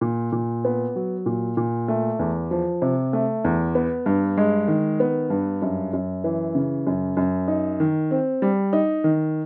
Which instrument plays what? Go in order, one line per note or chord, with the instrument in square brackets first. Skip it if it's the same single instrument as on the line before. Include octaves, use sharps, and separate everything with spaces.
[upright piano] A#2
A#2
B3
F#3
A#2
A#2
A3
E2
F3
C3
A3
E2
B3
G2
G#3
D#3
B3
G2
F#2
F#2
E3
C#3
F#2
F#2
D#4
D#3
C4
G3
D#4
D#3